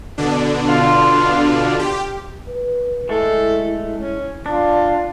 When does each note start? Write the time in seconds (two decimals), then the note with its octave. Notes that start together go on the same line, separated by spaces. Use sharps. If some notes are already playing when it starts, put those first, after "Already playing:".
0.18 B2 D3 D4
0.69 F4
1.79 G4
2.47 B4
3.09 G#3 A3 E4 A4
3.95 C#4
4.46 D4 F4 D5